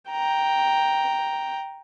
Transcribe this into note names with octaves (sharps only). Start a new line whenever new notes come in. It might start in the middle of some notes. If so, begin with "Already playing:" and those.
G5 A#5